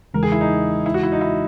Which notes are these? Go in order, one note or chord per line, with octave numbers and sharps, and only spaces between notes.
E2 C#3 E3 G#3 A#4
G#4
E4
D#4
E4
F#4
E4
D#4
E4